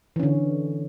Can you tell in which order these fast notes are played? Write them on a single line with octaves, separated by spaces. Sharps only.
E3 C#4 D3